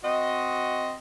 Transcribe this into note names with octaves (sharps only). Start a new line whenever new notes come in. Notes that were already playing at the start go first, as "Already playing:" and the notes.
C4 F#4 D#5